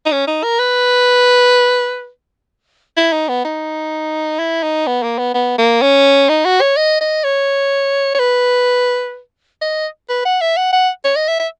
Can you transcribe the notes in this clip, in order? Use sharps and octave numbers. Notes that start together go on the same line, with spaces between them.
D#4
C#4
D#4
A#4
B4
E4
D#4
B3
D#4
E4
D#4
B3
A#3
B3
B3
A#3
C#4
D#4
F#4
C#5
D#5
D#5
C#5
C#5
B4
D#5
B4
F#5
E5
F#5
F#5
C#5
D#5
E5
E5